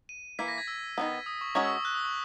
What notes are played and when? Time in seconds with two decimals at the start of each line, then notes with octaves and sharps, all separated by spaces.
0.09 D#7
0.39 E3 A#3 E4 B6
0.48 A#6
0.58 G#6
0.68 E6
0.98 D#3 F#3 B3
1.26 D#6
1.41 C#6
1.55 G#3 C#4 F#4 A#4 C#5 C#6
1.64 E6
1.70 D#6
1.85 F#6
1.94 D#6
2.05 C#6